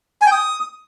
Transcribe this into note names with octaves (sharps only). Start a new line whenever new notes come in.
G#5
G5
D#6